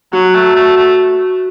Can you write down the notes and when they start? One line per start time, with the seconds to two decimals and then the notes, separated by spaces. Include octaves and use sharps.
0.13 F#3 F#4
0.35 A3
0.56 A3
0.77 A3